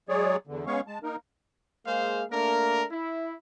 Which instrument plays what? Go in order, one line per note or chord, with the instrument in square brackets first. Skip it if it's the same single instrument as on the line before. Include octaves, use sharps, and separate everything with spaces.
[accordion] F#3 G#3 G#4 C#5 D5
E2 D3
G#3 B3 C#4 C#5 F5 C#6
G#3 A5
A#3 D#4 A#4
[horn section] G#3 A#3 G#4 C5 F5
A3 A#3 D4 A#4
E4